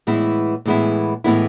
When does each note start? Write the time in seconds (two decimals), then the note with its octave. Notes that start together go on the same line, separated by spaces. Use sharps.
0.07 A2 E3 G#3 B3 E4
0.65 A2 E3 G#3 B3 E4
1.24 A2 E3 G#3 B3 E4